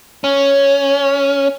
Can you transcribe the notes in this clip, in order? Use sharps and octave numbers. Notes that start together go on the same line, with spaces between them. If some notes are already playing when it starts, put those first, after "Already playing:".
C#4